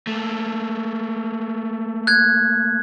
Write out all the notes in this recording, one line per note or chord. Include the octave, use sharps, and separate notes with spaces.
A3 A#3
F#6 G#6